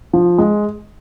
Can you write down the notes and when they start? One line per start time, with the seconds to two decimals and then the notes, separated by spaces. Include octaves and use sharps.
0.13 F3
0.38 G#3